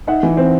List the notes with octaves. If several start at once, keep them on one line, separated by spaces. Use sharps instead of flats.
D#4 E5 F#5
E3
C4